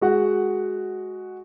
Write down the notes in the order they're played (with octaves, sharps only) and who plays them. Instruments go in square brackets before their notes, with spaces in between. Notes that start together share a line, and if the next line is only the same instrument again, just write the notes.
[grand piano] G#3 F#4 F#5